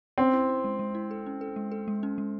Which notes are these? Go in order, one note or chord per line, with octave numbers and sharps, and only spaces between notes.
C4 C#4
E4
E4
G#3
G#3
E4
A4
C#4
A4
G#3
A4
G#3
C#4
G#3